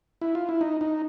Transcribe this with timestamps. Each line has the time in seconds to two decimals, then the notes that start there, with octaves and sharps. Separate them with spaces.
0.22 E4
0.35 F4
0.49 E4
0.61 D#4
0.81 D#4